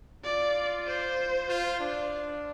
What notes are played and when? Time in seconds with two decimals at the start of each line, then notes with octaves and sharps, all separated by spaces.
0.24 F4 D5
0.87 C5
1.48 F4
1.80 D4